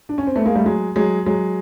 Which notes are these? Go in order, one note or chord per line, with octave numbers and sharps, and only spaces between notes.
D4
C#4
C4
A3 B3
G#3 A#3
G3 A3
F#3 G#3
F#3 G#3
F#3 G#3